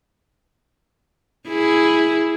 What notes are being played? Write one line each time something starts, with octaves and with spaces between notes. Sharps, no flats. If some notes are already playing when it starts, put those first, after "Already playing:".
E4 G#4